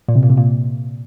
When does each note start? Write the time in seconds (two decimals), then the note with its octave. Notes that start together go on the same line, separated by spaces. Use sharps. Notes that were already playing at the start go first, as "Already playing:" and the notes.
0.08 A#2
0.15 C3
0.23 A#2
0.30 C3
0.37 A#2